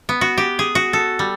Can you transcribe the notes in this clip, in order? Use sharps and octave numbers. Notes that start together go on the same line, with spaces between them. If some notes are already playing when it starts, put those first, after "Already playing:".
B3
F#4
G4
G#4
F#4
A4
G3